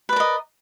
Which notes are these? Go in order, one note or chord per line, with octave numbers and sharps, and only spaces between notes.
A#4 B4 D5 D#5